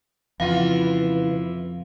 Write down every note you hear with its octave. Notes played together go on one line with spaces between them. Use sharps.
F2 C#3 E3 E4 F4 B4 F5